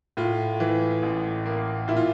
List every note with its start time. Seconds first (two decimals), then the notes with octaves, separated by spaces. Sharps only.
0.17 A2 F4
0.60 E3
1.03 A1
1.46 A#3
1.88 A#2 E4
1.97 F4